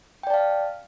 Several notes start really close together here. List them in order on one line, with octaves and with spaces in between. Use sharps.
G5 D5 A5 F5